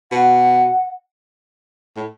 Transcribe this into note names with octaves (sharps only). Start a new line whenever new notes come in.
B2 F#5
A2